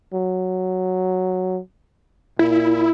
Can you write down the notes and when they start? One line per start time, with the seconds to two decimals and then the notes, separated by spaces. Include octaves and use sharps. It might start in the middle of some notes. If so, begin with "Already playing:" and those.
0.14 F#3
2.39 A#2 E4